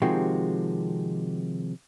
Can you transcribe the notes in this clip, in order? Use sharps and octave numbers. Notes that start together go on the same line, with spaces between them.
C3 D#3 F3 G#3 F#4 G4